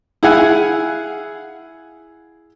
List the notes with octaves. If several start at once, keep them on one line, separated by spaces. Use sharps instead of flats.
E4 G#4 F5 F#5 G#5